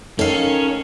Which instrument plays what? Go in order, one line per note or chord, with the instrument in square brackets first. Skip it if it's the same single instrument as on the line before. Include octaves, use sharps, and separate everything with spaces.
[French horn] D#3 [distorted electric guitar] C#4 [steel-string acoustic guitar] A4 F5